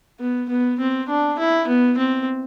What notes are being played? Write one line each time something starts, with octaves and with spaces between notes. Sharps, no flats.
B3
B3
C4
D4
E4
B3
C4